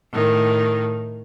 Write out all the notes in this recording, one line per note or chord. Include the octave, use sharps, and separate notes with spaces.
A2 D#3